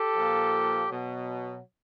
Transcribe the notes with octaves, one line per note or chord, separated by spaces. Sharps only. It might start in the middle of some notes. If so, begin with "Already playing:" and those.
Already playing: G4 A4
A#2 F3
B2 F#3